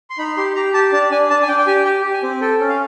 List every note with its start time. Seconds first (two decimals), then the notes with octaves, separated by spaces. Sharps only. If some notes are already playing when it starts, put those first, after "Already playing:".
0.10 C6
0.18 D#4 B5
0.37 G4 C6
0.55 G4 A#5
0.74 G4 A5
0.92 D4 A5
1.11 D4 G#5
1.30 D4 A5
1.42 G#5
1.48 D4 G5
1.58 G5
1.67 G4 G#5
1.85 G4 G5
2.04 G4
2.13 G#5
2.23 C4
2.41 A4 G5
2.60 C#4
2.69 F5